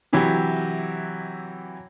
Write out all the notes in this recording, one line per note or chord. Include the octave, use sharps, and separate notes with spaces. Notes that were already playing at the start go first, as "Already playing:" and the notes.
C3 E3 F#3 E4 G4